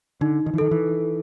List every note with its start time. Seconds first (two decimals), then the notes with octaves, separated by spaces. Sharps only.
0.21 D3 D#4
0.46 D#3
0.54 E3
0.58 D#3 A4
0.71 E3